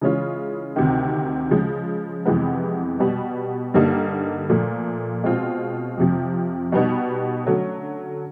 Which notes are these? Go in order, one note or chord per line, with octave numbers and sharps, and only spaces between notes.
C#3 E3 G#3 C#4 F4
D2 C3 D#3
C#3 F3 G#3
F2 C3 E3 G#3 B3
B2 G3 B3
G2 D3 G3 A#3 D#4
A#2 F3 A3
B2 G#3 C4 F4
F2 C3 F3
B2 G3 B3 D#4
D3 F#3 A3 C#4